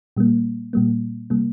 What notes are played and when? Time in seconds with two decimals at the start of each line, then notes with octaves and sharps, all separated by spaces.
0.17 A#2 G3 A#3
0.73 A#2 G3 A#3
1.30 C3 G3 A#3